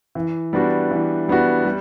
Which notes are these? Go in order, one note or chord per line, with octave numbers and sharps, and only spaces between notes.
E3
G3 B3 D4 F#4
E3
G3 B3 D4 F#4
G3